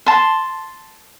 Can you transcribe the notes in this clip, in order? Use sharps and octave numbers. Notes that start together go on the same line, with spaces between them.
A5 C6